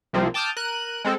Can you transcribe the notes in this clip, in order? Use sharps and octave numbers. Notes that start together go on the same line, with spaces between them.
C2 C3 F3 A#3 C4
G5 A5 D6 D#6 F6 G6
A#4 F#6 D#7
G#3 C4 A4